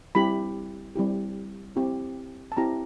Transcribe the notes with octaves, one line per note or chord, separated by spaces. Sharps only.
G3 C4 E4 G4 B5
G3 C4 E4 G4
C4 E4 G4
A5
C4 E4 G4 A#5